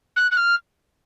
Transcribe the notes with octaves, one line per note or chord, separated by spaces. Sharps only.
F#6
F#6
F6